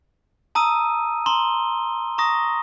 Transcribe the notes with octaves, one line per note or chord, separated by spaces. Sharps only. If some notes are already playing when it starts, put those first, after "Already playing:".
A5 A#5 D#6 E6 D#7
A#5 C6 G7
A#5 C#6 D#6 A#6